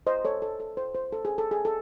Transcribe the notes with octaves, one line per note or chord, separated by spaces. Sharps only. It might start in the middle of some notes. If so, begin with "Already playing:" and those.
C5 D#5
A4 C#5
A4
A4
C5
C5
A4
G#4
A4
G#4
A4